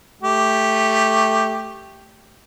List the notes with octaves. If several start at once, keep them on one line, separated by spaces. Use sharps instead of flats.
A3 G4